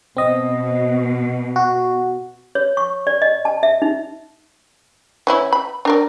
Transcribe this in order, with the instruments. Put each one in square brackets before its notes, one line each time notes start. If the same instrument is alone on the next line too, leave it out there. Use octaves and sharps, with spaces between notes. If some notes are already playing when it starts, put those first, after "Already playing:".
[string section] B2 [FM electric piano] C4 D#5
[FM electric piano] F#4
[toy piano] C#5
C#6
D5
D#5
A5
E5
D#4
[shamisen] E3 C#4 E4
B5
D4 A#4 D5